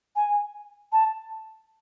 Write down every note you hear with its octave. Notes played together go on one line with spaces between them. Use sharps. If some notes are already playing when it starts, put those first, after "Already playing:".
G#5
A5